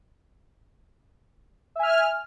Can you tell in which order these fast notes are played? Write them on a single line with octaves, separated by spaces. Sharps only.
E5 G#5 F6